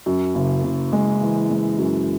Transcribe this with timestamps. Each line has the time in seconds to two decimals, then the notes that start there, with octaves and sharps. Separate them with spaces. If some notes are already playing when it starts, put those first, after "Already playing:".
0.06 F#2
0.35 F#1
0.64 F#1
0.92 G#3
1.21 E3
1.50 G#3
1.78 F#2